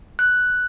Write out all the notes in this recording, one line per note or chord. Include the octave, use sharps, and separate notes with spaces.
F#6